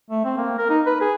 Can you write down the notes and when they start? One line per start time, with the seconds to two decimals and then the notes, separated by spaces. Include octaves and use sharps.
0.10 A3
0.25 C4
0.37 A#3
0.58 A#4
0.70 D#4
0.86 B4
1.01 G#4